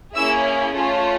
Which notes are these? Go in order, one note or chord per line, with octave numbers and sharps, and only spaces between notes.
A#3 C#4 E4 G#4 E5 E6
A3 C#4 F4